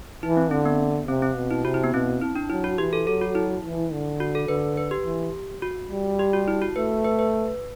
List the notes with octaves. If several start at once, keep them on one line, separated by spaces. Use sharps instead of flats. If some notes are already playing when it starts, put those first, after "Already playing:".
E3 E4
C4
D3 C4
B3
C3 C4
C4
B2
E4
C3 F#4
E4
B3
B2 C4
E4
D4
F#3 E4
F#4
E3 G4
A4
F#3 A4
F#4
E4
E3
D3
F#4
A4
D3 B4
B4
G4
E3
F#4
G3
G4
F#4
E4
F#4
A3 B4
B4
B4